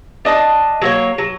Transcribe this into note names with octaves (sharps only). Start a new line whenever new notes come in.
D4 D#5 A5
F#3 A#3 C#5
F#3